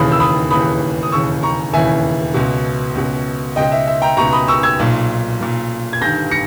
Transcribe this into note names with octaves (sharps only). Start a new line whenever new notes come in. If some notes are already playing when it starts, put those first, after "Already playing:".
Already playing: E1 D#2 C#3 E3 B5 D#6
E6
B5 D#6
E1 D#2 C#3 E3 B5 D#6
D#6
E1 D#2 C#3 E3 C#6 E6
A#5 C#6
E1 D#2 C#3 E3 E5 G#5
C#2 B2
C#2 B2
C#2 B2 D#5 G5
E5
E5
G5 A#5
C#2 B2 A#5 C#6
B5 D#6
C#6 E6
E6 G#6
B1 A#2
B1 A#2
G#6
G1 G2 D#3 G6 A#6
A#6 C#7